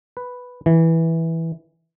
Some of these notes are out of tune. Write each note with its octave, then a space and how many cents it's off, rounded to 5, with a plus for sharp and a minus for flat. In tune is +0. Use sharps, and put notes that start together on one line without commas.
B4 +0
E3 -10